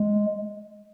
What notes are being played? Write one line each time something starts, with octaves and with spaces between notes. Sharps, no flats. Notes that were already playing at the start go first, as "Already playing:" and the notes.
Already playing: G#3